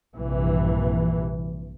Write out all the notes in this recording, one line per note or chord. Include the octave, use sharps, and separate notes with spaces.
A#1 G2 C3 E3